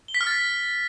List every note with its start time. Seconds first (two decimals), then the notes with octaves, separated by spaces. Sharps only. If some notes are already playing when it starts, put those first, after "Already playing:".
0.08 G7
0.14 B6
0.21 F6
0.27 A6